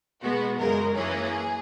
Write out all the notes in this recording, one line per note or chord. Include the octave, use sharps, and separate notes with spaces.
B2 G#3 B3 F#4
F#2 C#3 G#3 A#4
F#2 E3 A#3 C#4 G#4